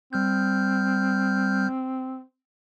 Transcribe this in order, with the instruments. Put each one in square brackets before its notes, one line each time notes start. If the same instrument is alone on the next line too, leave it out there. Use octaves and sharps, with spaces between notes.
[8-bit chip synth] G3 F6 G6 [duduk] C4